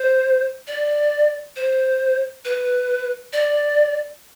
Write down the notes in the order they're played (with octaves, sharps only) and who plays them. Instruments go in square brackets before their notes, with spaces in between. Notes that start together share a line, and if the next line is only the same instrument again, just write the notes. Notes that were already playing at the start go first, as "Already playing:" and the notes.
Already playing: [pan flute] C5
D5
C5
B4
D5